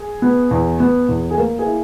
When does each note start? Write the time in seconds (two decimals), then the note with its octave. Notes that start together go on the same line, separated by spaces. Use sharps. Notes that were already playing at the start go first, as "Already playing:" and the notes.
Already playing: G#4
0.22 B3
0.51 E2
0.80 B3
1.08 E2
1.31 G#4
1.37 A#3 A#4
1.59 G#4
1.66 E4